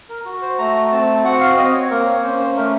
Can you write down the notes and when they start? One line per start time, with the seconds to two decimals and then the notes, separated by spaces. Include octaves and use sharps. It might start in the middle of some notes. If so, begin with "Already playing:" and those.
0.09 A#4
0.25 F#4
0.42 C5
0.59 A3 A#5
0.91 C4 A5
1.24 F#4 F#5
1.40 F5
1.57 C4 D#5
1.74 C#5
1.90 A#3 A#4
2.07 C#5
2.23 C#4 C5
2.39 C5
2.56 A3 A#4